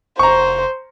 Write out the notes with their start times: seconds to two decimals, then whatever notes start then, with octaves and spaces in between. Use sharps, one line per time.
0.19 F1 C5 A#5 C#6